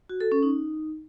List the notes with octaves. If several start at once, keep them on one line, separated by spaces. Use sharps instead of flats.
F#4
A4
C#4
D#4